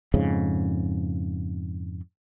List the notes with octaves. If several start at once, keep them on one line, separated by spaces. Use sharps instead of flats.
F2 G#2 C#3